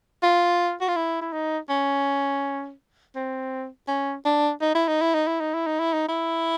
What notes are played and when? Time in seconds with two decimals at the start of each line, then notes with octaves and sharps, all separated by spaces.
0.23 F4
0.81 F#4
0.88 F4
0.96 E4
1.21 E4
1.33 D#4
1.69 C#4
3.16 C4
3.88 C#4
4.25 D4
4.62 D#4
4.75 E4
4.88 D#4
5.02 E4
5.14 D#4
5.27 E4
5.40 D#4
5.54 E4
5.66 D#4
5.80 E4
5.93 D#4
6.09 E4